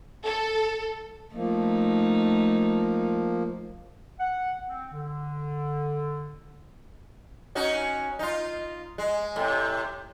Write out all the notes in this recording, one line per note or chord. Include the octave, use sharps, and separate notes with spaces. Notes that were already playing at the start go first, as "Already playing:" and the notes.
A4
F3 A3 A#3 D#4
F#5
C4
D3
C#4 D#4 F#4
D#4 F4
G#3
A2 C3